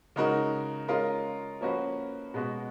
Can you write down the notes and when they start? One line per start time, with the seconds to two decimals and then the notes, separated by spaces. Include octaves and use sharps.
0.16 C#3 G#3 D#4 F#4 A#4
0.88 G#3 C#4 F4 A#4 D#5
1.61 F3 A#3 C#4 F#4 B4
2.34 B2 G#3 B3 F#4